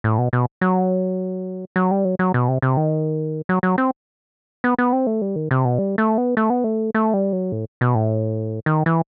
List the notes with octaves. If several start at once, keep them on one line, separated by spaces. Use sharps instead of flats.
A2
B2
B2
F#3
F#3
G3
F#3
F#3
B2
C3
C3
D#3
F#3
F#3
C4
B3
B3
C4
A3
G3
D#3
C3
B2
G3
A3
B3
A3
B3
A3
A3
G3
F#3
A2
B2
A2
D#3
E3